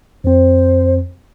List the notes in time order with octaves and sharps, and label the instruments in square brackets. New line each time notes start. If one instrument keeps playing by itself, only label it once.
[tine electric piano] F2 C4 [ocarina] C5